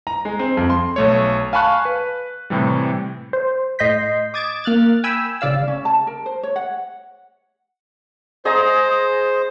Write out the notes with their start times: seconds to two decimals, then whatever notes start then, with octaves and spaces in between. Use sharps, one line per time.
0.07 A#5
0.25 G#3
0.39 C4
0.57 F2
0.70 C6
0.96 B1 A3 C#5
1.53 F5 G#5 A5 B5 C#6 F#6
1.85 B4
2.50 A2 C3 E3 G3
3.33 C5
3.79 A2 D#5 C6 G6 B6
4.34 D6 D#6 G#6 A6 D7 E7
4.64 A#3 F6 F#6 A6
5.04 G5 G#5 B5 E6
5.41 G#1 C#3 D5 F5 E6
5.68 C#4
5.85 A5
6.07 A#4
6.26 C5
6.43 C#5
6.56 F#5
8.45 G#4 C5 D#5 A#5